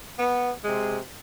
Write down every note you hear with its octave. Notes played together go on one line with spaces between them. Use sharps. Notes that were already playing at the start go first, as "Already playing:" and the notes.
B3
C3 G#3